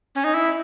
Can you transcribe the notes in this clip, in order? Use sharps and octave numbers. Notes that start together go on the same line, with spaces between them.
C#4
D#4
E4